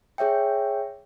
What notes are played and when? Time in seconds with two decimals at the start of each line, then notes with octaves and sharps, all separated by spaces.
0.18 G#4 C#5 E5 G5